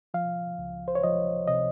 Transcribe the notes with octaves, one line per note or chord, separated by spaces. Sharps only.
F3 F5
C#2
C5
C#5
F3 D#5
C3 D#5